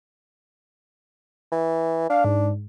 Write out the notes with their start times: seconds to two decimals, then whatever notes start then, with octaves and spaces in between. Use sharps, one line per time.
1.52 E3
2.10 D4 F5
2.25 G#2